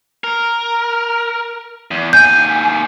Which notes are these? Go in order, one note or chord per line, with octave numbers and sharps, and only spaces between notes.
A#4
E2
D#2 G#5 G6